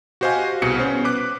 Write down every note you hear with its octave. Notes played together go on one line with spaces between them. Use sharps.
F#4 G4 C5 D#5 F5 G#5
C2 B2 G#4 C#7
B3 C#4 C5
B4 D6 F#6